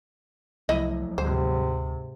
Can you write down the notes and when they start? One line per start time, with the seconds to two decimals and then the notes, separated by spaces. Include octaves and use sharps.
0.69 C2 F3 F#3 A3 E4 D#5
1.18 D2 G#2 C3 C5